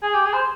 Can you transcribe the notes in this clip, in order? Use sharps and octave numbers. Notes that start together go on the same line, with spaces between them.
G#4
G4
G#4
C5